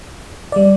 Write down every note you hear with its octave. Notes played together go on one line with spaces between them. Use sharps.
D5
G3